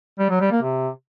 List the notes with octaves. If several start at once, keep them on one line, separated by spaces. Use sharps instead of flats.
G3
F#3
G3
A#3
C3